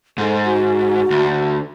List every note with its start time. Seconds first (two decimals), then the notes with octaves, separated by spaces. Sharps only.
0.18 G#2 A4
0.45 F#4
1.10 D2